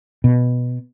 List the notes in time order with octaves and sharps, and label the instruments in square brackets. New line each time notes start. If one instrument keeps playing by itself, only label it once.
[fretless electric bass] B2